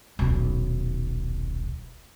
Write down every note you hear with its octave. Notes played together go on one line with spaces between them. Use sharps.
D#1 B1